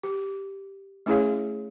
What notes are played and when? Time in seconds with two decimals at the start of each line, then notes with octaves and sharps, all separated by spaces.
0.03 G4
1.06 A3 C#4 E4 G#4 C#5 F5